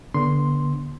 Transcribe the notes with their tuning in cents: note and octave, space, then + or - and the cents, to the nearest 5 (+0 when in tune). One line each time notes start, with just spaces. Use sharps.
D3 -20 B3 -40 C6 +0